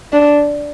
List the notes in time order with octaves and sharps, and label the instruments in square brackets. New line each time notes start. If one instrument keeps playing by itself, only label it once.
[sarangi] D4